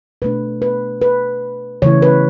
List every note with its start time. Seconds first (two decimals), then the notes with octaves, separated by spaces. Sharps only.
0.22 B2 A3 D4 B4
0.62 B4
1.01 B4
1.82 C#3 E3 A3 E4 C#5
2.02 B4